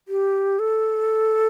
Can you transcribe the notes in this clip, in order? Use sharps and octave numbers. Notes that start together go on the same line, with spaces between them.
G4
A4